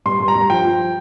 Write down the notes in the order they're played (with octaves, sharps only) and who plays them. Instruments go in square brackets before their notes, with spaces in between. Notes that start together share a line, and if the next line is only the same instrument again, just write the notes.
[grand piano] G2 C6
G2
A#5
G2
F3 G5
F3